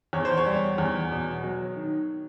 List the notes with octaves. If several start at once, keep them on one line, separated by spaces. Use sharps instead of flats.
E2 C#5
C5
C#5
G3
E2
B2
F#3
D#3